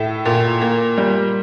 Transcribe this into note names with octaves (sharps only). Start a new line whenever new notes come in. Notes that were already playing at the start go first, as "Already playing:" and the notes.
Already playing: A2 E5
A#2
A#3
G3